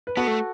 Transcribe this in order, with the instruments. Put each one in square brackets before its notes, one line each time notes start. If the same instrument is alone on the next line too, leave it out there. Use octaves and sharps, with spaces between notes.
[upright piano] B4
[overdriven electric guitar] B3 [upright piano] F#4 A4
[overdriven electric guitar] A3